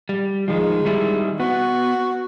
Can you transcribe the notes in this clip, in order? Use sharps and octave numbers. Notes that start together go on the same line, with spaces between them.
G3
D#3 F3 G#3
D#3 G3 E4
B3 F#4